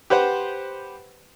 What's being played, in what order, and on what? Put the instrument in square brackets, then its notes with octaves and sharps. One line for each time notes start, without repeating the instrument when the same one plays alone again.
[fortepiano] G4 B4 C5 F#5